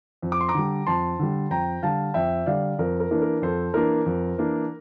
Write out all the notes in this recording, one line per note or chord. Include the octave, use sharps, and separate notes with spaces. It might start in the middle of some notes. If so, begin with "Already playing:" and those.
F2
D6
C6
A#5 D6
D3 G3
F2 A5 C6
D3 G3
F2 G5 A#5
D3 G3 F5 A5
F2 E5 G5
D3 G3 D5 F5
F2 A#4
A#4
E3 A#3 D4
A#4
F2 A4 C5
E3 A#3 D4 A#4
F2
E3 A#3 D4